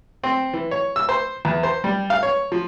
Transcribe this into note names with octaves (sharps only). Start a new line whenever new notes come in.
C4
E3
C#5
E6
C5
E2
C5
G3
F5
C#5
F3